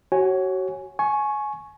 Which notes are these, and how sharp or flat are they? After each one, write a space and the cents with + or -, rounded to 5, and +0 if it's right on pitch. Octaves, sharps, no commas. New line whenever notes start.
F#4 +30 C#5 -20 G#5 +0
G#5 +20 C#6 -10